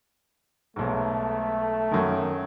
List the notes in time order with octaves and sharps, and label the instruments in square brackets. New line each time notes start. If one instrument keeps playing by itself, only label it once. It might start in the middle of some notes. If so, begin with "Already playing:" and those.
[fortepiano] B1 G#2 [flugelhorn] A3
[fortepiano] F#2 D#3